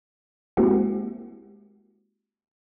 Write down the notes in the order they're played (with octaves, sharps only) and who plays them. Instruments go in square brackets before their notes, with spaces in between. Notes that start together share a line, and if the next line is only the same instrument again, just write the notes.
[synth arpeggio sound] G#3 A#3 C4 E4 F#4 G4